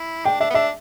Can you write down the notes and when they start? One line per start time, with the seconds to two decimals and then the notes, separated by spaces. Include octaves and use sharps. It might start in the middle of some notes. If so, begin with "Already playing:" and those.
Already playing: E4
0.25 D4 G5
0.40 D4 E5
0.50 B3
0.54 D4 E5